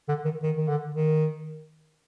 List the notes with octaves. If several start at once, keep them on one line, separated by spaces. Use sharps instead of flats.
D3
D#3
D#3
D#3
D3
D#3